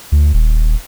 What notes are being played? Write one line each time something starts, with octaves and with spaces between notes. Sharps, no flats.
D2
D#1